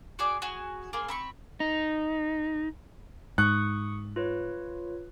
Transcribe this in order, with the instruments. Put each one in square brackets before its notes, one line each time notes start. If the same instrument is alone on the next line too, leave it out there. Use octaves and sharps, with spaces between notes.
[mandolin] F#4 G#4 D5 D6
F#4 G#4 G#5
A#3 G#4 C5
C4 B5 C#6
[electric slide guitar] D#4
[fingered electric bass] G#2 [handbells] C#6 D#6 C#7 [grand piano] F#6
[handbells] F4 B4 C#5